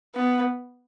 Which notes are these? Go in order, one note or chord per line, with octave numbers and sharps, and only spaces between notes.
B3